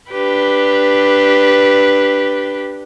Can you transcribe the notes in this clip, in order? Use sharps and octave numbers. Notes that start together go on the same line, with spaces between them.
D4 G4 B4